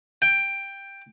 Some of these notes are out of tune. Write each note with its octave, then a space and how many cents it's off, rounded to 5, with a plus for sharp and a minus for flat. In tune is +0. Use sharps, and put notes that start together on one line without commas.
G5 +10